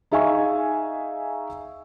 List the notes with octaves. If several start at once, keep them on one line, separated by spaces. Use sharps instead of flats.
D#4 G#4 E5 F5 G#5 C#6